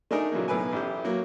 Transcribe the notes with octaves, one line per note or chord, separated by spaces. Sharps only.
A3 D4 D#4 G#4 A#4
A#2 C#3 E3 F#3 A#3
B1 A2 B4 G#5
A1 G4
F#3 A#3